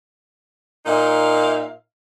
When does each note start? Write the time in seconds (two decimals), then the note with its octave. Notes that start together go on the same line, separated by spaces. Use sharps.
0.86 A#2 D#4 E5 F5